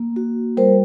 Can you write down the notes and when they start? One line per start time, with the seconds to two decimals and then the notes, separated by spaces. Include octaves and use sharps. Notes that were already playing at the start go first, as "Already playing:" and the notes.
Already playing: A#3
0.16 F#4
0.57 G3 A#4 C5